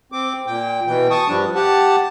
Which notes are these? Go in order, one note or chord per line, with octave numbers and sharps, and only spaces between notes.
C4 D6
A#2 G5
B2 E3 G5
A5 C#6 D#6
G2 F3 G3 D4
G4 F#5 A5